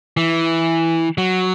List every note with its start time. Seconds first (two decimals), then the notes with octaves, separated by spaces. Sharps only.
0.17 E3
1.18 F#3